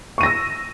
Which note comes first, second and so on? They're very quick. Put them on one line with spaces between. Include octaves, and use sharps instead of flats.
C#6 D#7 A#6 E6